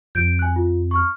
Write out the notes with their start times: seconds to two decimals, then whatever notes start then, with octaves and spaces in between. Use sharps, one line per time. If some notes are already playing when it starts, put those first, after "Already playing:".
0.15 F2 G6 D7
0.39 G#5 F#6
0.56 F4
0.91 C#6 F6